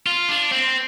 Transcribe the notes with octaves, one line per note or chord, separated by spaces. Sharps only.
F4
D4
C4